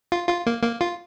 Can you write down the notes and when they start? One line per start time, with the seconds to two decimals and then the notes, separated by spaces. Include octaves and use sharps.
0.12 F4
0.29 F4
0.46 A#3
0.63 A#3
0.81 F4